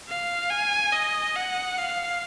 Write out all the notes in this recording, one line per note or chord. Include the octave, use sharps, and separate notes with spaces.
F5
G#5
D#5
F#5
F5